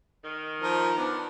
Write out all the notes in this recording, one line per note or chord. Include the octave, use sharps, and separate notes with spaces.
D#3
F3 D#4 A#4
B3 D4